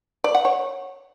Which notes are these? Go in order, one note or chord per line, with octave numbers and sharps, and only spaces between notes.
D5
F#5
C#5